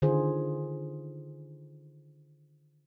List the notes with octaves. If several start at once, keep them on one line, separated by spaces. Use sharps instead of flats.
D3 D#3 F4 G#4 C5